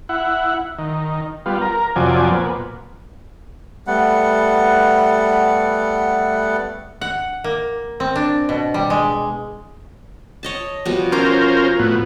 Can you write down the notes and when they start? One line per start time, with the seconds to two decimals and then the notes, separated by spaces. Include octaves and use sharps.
0.09 E4 F#5
0.79 D#3
1.46 G3 B3 F4
1.61 A#4
1.96 F2 C3 F3 F#3 D5 G#5
2.31 A#2 B3
3.87 G3 A3 B3 F#5
7.01 F#5
7.44 A#3
8.00 C4
8.16 D4
8.49 B2
8.74 G3
8.90 G#3
10.43 C#5 D#5 A5
10.85 B2 F3 G3
11.12 C#4 F4 A#4 C5 D6
11.79 A2 B3